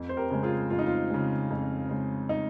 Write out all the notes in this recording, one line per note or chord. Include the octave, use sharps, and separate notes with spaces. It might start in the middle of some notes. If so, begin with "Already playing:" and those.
Already playing: F2
C5
G4 A#4
C#3 G#3
F4 G#4
F2 F4
D#4
F4
C#3 G#3
F2
C#3 G#3
D#4